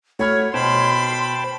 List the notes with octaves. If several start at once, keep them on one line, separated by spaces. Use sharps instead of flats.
A3 F#4 C#5 B5 F6
B2 C5 G5 A5 B5 C6